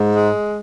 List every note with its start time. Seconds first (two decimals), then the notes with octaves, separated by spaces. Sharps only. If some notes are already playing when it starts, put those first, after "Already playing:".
Already playing: G#2
0.15 G#3